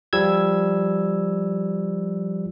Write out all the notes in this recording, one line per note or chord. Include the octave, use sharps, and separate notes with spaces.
F3 G3 E6 G#6